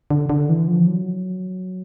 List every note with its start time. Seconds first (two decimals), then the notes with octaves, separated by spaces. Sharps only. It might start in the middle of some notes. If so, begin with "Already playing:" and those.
0.10 D3
0.30 D3
0.49 E3
0.68 F3
0.87 F#3